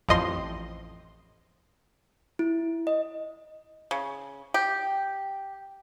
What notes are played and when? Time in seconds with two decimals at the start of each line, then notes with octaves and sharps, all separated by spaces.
0.09 A1 F2 D#5 C6
2.39 E4
2.87 D#5
3.91 C#3
4.54 G4